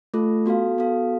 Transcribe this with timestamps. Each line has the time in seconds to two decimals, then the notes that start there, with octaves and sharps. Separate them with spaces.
0.14 A3 F4 A4
0.46 B3 F#4 A4 F5
0.78 B3 F#4 A4 F5